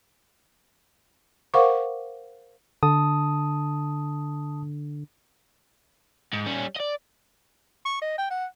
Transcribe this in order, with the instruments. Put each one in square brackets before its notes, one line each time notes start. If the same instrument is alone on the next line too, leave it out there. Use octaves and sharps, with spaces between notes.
[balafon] A#4 C5 F5 F#5 C#6 D6
[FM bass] D3 [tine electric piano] A5 D#6
[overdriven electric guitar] G#2
G3 C#4
D5 D#5
[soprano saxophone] C#6
D#5
G5
F#5